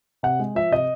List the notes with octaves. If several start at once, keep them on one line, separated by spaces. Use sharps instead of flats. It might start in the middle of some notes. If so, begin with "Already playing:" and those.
C3 F#5
G#3
F3 E5
C3 D#5